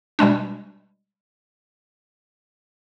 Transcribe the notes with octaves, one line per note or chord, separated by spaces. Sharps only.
B2 G3 G#3 D4